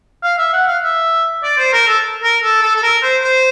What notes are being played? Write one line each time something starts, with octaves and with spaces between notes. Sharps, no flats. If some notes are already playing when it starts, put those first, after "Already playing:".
F5
E5
F#5
F5
E5
D5
C5
A#4
A4
A#4
A4
A4
A4
A#4
C5
C5